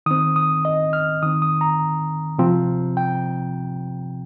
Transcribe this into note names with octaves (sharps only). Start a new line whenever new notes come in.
D#3 C4 D#6
D#6
D#5
F6
D#3 C4 D#6
D#6
A#5
C3 F3 C4
G5